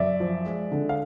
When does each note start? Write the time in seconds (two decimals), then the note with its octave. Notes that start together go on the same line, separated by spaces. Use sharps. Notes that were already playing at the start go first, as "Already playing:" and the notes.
Already playing: F#2 D5 E5
0.20 F3
0.46 G#3
0.72 D3
0.89 F5